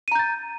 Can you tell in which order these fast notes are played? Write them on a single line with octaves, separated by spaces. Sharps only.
D#7 A#5 G6 A6